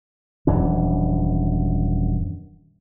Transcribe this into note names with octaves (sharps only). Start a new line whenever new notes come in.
D#1 F#2 E3 D4